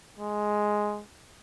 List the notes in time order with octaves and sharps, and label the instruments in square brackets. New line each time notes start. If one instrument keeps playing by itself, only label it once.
[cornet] G#3